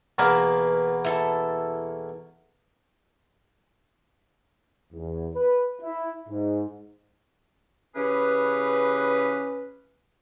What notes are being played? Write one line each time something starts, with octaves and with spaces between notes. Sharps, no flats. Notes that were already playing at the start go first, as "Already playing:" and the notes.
E2 B2 A#3 A#4 B4 A5
E4 A4 A5
E2
B4
E4
G#2
C#3 E3 C#4 G4 G#4 B4